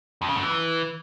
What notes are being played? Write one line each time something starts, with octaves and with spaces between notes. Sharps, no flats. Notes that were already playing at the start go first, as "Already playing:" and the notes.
F2
C#3
F#2
E3